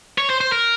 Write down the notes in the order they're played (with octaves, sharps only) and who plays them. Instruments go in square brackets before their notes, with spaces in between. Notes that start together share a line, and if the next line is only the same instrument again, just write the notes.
[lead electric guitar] C#5
C5
C5
A#4